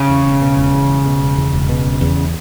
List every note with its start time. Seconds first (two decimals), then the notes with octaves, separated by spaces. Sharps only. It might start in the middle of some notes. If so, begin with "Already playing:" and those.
Already playing: C#3
0.09 E2
0.25 E1
0.42 B2
0.57 E1
0.73 E2
0.89 E1
1.06 B2
1.21 E1
1.37 E2
1.53 E1
1.69 B2
1.86 E1
2.01 E2